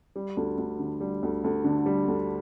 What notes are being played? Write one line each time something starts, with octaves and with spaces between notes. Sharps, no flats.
G3
D2
D2
D3
G3
D2
D2
D3
G3
D2